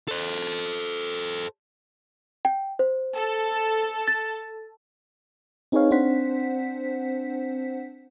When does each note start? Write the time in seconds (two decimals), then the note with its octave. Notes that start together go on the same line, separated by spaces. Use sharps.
0.08 A4 C5
2.45 G5
2.79 C5
3.14 A4 A5
4.08 A6
5.72 C4 D#4 G#4 B4 C#5 F5
5.91 C4 D4 C5 F#5 B6